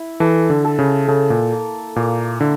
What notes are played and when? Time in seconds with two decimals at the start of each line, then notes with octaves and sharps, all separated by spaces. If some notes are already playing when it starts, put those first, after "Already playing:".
Already playing: E4
0.20 E3 A4
0.50 D3
0.65 A4
0.79 C#3
1.08 C#3 A4
1.30 A#2
1.52 A#3
1.96 A#2 A#3
2.40 D3 E4